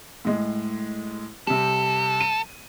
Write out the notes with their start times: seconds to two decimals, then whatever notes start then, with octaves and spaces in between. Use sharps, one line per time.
0.25 A2 G#3
1.47 C3 G3 A4
2.21 D#7